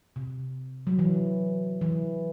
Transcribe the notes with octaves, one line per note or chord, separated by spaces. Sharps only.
C3
F#3
E3
E3